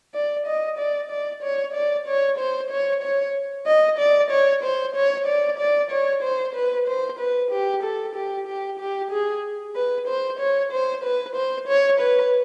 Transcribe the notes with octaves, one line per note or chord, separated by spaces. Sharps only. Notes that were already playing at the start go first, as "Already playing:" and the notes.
D5
D#5
D5
D5
C#5
D5
C#5
C5
C#5
C#5
D#5
D5
C#5
C5
C#5
D5
D5
C#5
C5
B4
C5
B4
G4
A4
G4
G4
G4
G#4
B4
C5
C#5
C5
B4
C5
C#5
B4